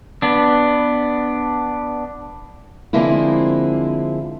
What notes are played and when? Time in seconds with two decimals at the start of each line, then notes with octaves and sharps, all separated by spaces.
0.22 B3 D4
2.93 D3 F3 G#3 A#3 C4 E4